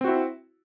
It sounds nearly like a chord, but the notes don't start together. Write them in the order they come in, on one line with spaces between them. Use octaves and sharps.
C4 F#4 E4